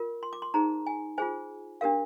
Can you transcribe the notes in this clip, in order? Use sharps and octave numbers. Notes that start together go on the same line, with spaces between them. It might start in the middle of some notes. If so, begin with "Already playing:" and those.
Already playing: F4 A#4
C6
D6
C6
D#4 G#4 C5 A#5
G#5
F4 G#4 C5 G#5
D4 G4 A#4 F5